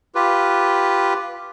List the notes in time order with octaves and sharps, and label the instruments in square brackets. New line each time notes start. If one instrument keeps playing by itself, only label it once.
[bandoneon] F4 G4 B4